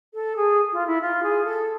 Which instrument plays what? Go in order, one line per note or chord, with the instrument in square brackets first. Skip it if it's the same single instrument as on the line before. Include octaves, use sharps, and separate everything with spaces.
[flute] A4
G#4
F4
E4
F4
G#4
A4